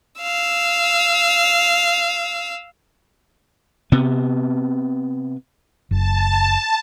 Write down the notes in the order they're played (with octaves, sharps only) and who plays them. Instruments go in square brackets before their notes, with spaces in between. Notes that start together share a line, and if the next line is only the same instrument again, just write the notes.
[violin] F5 E6
[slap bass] C3 B3
[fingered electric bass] F#1 [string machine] A5